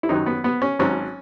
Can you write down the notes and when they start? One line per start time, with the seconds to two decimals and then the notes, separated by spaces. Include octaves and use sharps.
0.03 E4
0.09 F#2 D#3 F#3 D#4
0.26 B3
0.44 B3
0.62 C#4
0.79 G#1 G#2 F#3 C#4